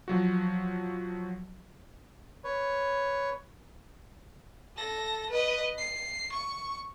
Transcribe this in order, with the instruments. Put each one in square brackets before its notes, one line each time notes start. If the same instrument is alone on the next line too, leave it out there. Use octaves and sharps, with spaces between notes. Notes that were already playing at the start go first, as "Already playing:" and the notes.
[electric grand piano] F3 F#3 F#4
[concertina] B4 C#5
[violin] A4 A#6
B4 D#5
C7
C#6